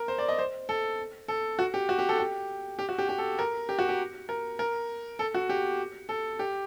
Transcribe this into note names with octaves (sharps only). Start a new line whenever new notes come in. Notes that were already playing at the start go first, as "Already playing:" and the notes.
Already playing: A#4
C5
D5
D#5
C5
A4
A4
F#4
G4
F#4
G4
A4
G4
G4
F#4
G4
G4
A4
A#4
G4
F#4
G4
A#4
A#4
A4
F#4
G4
A4
G4